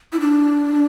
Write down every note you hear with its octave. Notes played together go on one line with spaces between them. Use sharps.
E4
D4